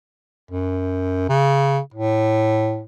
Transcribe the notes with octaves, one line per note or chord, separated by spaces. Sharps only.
F#2
C#3
A2